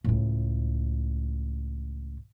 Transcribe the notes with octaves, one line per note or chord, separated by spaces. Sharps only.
C#2 A2